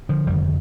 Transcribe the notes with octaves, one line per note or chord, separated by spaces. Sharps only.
D3 F3
F1 F2 D3 D#3 G3